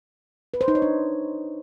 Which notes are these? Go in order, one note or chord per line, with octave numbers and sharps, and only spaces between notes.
B4
C5
D#4
C#5
D4